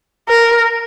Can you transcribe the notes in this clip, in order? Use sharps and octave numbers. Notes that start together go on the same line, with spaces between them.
A#4